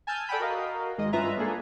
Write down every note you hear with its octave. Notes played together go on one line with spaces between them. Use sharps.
G#5 A5 E6 F6 G6
A4 D5 F#5 G5 B5
F#4 A#4 D#5 F5
G#1 G#3 D#5
G2 C#4 F4 B4 E5 A#5
G#3 A#3 D4 G#4 A4